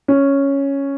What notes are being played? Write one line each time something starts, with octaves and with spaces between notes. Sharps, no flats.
C#4